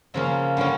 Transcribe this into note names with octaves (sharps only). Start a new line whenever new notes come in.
C#3 F3 A#3 C#4 E5
D3 G3 A#3 C#4